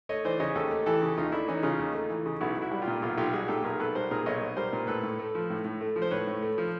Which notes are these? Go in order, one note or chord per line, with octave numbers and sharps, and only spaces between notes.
A3 C#5 D#5
E3 C5 D5
C#3 C#5 D#5
D#2 G4 A4
A3
E3 G4 A4
C#3
D#2 D#4 F4
A3 D4 E4
E3 C#4 D#4
C#3 D#4 F4
D#2
A3
E3
C#3
B1 E4 F#4
B1
E4 F#4
G3
F4 G4
A#2
B1 F4 G4
B1 F4 G4
G3 F#4 G#4
A#2 G4 A4
B1 G#4 A#4
B1 A4 B4
G3 A#4 C5
A#2 G#4 A#4
B1 C#5 D#5
B1
G3 A#4 C5
A#2
A2 A4 B4
A2
A3
F3
A2
A2
A3
F3
C5
A2 B4 C#5
A2
A3
F3